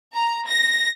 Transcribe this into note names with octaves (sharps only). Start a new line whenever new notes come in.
A#5
A#6